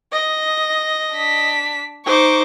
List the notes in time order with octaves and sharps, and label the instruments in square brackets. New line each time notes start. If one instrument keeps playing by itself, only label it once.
[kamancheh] D#5
[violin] D4 B6
[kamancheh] D#4 C5 [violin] C#6 D6